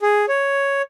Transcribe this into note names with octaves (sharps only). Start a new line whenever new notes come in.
G#4
C#5